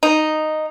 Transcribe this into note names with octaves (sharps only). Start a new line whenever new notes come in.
D#4